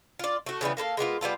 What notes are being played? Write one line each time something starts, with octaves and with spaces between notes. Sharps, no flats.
F4 D5
A3 F#4
C#3 E3 G3 B3
A#3 A4 B4 F5
G#3 A#3 B3 F4
G3 B3 F4 A4